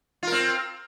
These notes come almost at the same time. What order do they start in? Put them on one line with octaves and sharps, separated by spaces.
F4 A#4 C4